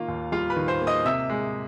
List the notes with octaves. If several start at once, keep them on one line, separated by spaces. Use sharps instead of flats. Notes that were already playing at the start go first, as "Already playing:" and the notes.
Already playing: D#3 A#3 F4 F5
D#2
G3 F4 F5
B4 B5
D#3
C5 C6
A#3
D#5 D#6
C3 E5 E6
G#3